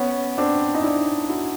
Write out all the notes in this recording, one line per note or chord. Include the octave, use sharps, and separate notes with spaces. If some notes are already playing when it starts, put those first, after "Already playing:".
Already playing: B3 C#4
C4 D4
D#4
D4 E4
E4 F#4